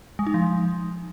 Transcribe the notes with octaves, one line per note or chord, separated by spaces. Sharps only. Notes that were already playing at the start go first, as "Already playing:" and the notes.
G#3
D#4
F3